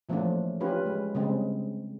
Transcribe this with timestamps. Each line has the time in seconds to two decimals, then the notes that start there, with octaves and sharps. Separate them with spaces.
0.09 E3 F3 A3 A#3 C#4 D4
0.60 C#4 D4 F4 G4 B4
0.86 G#3
1.15 C#3 G3 G#3 C4